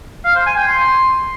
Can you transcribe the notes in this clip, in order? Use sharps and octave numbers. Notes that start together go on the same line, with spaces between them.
F5
C5
G#5
G5
C6